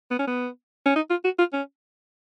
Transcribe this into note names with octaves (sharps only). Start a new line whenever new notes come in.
B3
C#4
B3
C#4
D#4
F4
F#4
F4
C#4